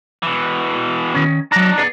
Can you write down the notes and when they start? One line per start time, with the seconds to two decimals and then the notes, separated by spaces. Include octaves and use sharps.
0.23 B2 E3
1.14 D#3 C#4
1.52 F#3 D4 D#4 A#5
1.78 B3 G#4 D5